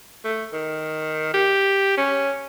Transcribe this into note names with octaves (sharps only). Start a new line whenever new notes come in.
A3
D#3
G4
C#4